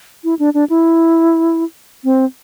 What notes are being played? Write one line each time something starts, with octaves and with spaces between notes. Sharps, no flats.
E4
D4
D4
E4
C4